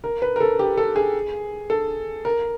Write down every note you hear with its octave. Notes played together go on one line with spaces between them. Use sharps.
A#4
B4
A#4
A4
G4
A4
G#4
A4
A#4